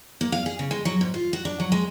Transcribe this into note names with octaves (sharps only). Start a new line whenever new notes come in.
A#3
F5
G#4
C#3
G#3
F#3
G#2
F4
F#4
D4
F#3
G#3